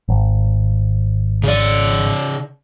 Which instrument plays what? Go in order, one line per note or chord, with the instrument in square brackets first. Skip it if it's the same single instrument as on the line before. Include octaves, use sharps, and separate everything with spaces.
[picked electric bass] G#1
[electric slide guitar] C#3 D5